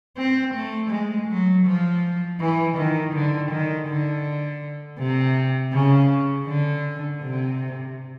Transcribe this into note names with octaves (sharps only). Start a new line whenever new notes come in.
C4
A3
G#3
F#3
F3
E3
D#3
D3
D#3
D3
C3
C#3
D3
C3